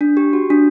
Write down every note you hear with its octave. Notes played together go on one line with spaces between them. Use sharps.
D4
G4
F#4
D4